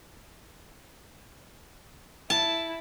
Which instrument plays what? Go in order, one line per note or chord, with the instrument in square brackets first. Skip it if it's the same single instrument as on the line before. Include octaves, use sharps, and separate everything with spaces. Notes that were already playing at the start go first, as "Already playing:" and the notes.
[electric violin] E4 [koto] A5